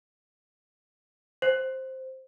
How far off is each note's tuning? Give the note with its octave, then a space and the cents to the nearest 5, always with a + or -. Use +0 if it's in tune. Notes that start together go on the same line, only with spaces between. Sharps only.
C5 +5